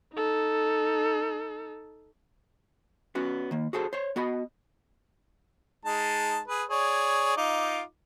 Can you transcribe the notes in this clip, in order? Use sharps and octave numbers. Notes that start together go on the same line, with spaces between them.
D#4 A4
B3 C#4 F#4
D#3 A#3
F#4 G#4 A4 C5
C5 C#5
B3 F#4 D#5 B5
G#3 D#4 A5
G#4 B4
G#4 C#5 D5
D#4 F4 D6